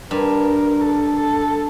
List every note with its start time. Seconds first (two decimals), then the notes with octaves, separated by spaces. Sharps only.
0.11 G2 A#4
0.81 A4
1.16 A4